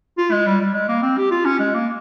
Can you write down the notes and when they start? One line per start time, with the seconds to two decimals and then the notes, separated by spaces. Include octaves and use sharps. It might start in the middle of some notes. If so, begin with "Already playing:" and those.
0.18 F4
0.32 G#3
0.47 G3
0.61 G3
0.74 G#3
0.88 A#3
1.02 C4
1.18 G4
1.31 F4
1.45 C#4
1.60 G#3
1.74 A#3